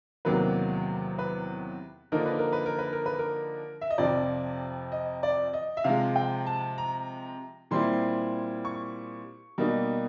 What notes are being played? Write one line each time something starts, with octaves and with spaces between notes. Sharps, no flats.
E2 C3 D#3 F#3 A#3 B4
B4
D3 F3 A#3 D#4 A#4
B4
A#4
B4
A#4
B4
A#4
B4
A#4
E5
D#5
F2 C3 F3 D5
D#5
D5
D#5
E5
C3 F3 G#3 F5
G5
A5
A#5
A#2 G3 C4 E4 C6
C#6
B2 G3 A#3 D#4